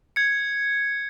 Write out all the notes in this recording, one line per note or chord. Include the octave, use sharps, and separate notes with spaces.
G#6 C#7